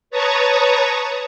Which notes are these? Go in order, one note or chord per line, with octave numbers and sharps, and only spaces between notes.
B4 C#5 A5 A#5 C#6 D#6